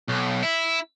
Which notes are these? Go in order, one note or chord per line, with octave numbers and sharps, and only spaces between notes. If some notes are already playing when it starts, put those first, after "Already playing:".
B1
E4